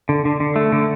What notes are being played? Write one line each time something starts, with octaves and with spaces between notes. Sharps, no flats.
D3
D3
D3
A3
D3